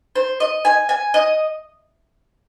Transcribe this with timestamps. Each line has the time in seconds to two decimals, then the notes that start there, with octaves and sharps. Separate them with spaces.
0.15 C5
0.40 D#5
0.65 G#5
0.89 G#5
1.14 D#5